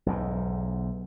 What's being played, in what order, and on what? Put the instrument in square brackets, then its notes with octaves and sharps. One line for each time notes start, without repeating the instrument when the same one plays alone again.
[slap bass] B1 E2 G#2